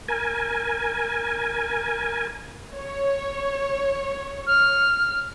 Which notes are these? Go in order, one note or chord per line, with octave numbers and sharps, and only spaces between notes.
A#4 G#5
C#5
F6